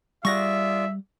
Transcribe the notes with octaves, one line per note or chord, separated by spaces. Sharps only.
G3 F4 G#4 D5 E5 F#5 C#6 A#6